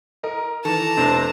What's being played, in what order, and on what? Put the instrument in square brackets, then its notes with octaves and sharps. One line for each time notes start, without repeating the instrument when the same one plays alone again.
[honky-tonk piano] A#4 D#5
[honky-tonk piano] D#3 E3 [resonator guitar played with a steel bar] A4 [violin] A5 A#5
[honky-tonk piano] F1 C3 [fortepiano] C4 D4